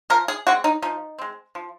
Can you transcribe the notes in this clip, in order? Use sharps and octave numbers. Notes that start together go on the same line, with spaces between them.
F3 A#4
G#4
G#3 C4 F#4
D#4
F3 D#4
G#3 C4
F3